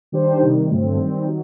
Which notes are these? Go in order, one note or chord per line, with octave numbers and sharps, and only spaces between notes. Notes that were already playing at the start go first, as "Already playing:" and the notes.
D#3 G3 D4 G4 C5
C3 D#3 G3
G2 D3 F#3 A3 C4
D#3 G3 C4
D#3 F#3